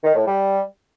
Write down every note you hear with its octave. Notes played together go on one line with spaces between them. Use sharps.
D#3
A2
G3